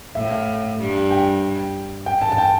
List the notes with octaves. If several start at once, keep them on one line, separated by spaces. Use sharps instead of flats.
A2 E5
F5
G2
G5
G5
A5
A5
G5